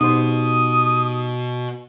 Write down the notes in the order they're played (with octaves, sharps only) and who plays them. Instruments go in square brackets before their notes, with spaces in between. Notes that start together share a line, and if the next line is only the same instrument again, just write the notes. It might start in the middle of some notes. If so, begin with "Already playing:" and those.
[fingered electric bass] B2 [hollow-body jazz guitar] D#4 G4 C5 [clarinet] D#6